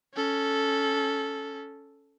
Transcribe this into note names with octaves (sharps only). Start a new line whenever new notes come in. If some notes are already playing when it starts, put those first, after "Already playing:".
C#4 A4